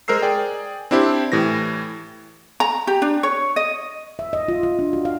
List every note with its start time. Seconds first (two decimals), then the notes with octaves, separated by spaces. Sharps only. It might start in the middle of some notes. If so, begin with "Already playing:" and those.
0.08 G#3 A#4 C5 E6 C7
0.22 G#4 D5 G5
0.91 C4 D4 E4 G4 C5
1.32 A2 E3 G4 A#6
2.60 A#5
2.87 G4
3.02 D4
3.23 C#5
3.56 D#5
4.19 E5
4.33 D#5
4.48 F4
4.63 F4
4.79 D4
4.93 F#4
5.05 F5